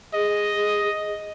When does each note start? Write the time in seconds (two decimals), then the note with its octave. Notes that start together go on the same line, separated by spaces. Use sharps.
0.14 G#4 D#5